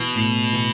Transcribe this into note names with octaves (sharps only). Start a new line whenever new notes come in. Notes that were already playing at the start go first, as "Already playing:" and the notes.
Already playing: B2 E3
A2
E3